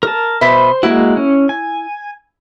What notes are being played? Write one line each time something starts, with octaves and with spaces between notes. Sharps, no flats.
A#4 A5
B2 B4 C5 E5
G#3 A#3 E4 F#4
C#4
G#5